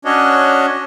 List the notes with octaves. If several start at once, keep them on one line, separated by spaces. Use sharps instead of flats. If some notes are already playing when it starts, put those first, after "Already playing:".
C#4 D4 F#4 C#5 D#5